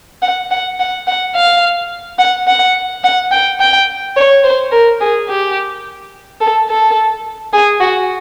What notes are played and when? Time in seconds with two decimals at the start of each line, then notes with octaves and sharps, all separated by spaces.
0.22 F#5
0.51 F#5
0.80 F#5
1.07 F#5
1.35 F5
2.19 F#5
2.47 F#5
3.04 F#5
3.32 G5
3.60 G5
4.17 C#5
4.44 C5
4.72 A#4
5.01 G#4
5.29 G4
6.41 A4
6.69 A4
7.53 G#4
7.81 F#4